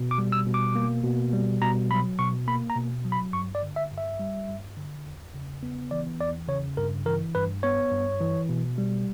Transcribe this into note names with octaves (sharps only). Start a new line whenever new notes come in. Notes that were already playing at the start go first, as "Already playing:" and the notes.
Already playing: B2
D6
G3
E6
B2
D6
A#3
B2
G3
B2 A#5
F#3 B5
B2 C#6
A#3 B5
A#5
B2
F#3
B5
G2 C#6
D5
D3
E5
G2
E5
G3
G2
D3
E2
C#3
B3
E3 D5
E2 D5
C#3 C#5
G2 A#4
E3 A#4
G2 B4
B3 C#5
G2
E3
B2
G3